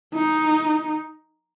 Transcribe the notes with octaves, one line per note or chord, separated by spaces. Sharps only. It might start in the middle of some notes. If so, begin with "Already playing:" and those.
D#4